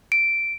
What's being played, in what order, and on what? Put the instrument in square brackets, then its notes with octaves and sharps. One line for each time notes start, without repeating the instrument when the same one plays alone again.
[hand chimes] D7